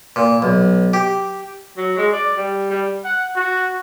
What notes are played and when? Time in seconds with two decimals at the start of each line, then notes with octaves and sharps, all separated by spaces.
0.16 A#2
0.42 B1
0.93 G4
1.77 F#3
1.97 G#3
2.13 D5
2.37 G3
2.70 G3
3.04 F#5
3.36 F#4